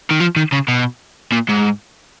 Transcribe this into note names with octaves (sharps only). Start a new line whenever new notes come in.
D#3
F3
D#3
C#3
B2
A#2
G#2